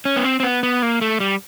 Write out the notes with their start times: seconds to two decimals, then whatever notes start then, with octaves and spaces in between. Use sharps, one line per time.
0.05 C#4
0.16 B3
0.25 C4
0.40 C4
0.43 B3
0.63 B3
0.82 A#3
1.01 A3
1.20 G3